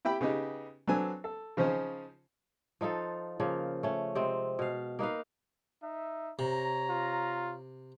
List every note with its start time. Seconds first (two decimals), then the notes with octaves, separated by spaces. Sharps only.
0.05 E4 G4 G5 B5
0.21 C#3 B3 D#4 G4
0.87 F#3 B3 C4 D4 A4 G#5
1.24 A4
1.57 C#3 F3 C#4 D#4 C5
2.81 F3 D#4 F4 A4
3.40 C#3 F3 A#3
3.83 A3 C#4
4.15 C3 G#3 C4
4.59 B2 F5
4.99 A#3 D#4 B4 F5
5.83 D#4 E5
6.39 C3 C#5 A#5
6.90 F4